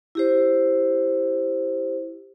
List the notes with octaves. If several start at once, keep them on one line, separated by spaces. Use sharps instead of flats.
E4 G4 C5